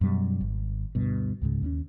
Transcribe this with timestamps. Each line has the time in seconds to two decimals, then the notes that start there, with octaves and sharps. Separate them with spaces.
0.01 F#2 B2 G3
0.41 G#1
0.95 D2 G2 B2
1.41 C#2 G#2 C#3
1.62 D#2 A3 C#4